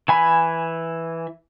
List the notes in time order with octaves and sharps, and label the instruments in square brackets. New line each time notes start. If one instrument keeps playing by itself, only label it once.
[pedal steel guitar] E3 G#5 B5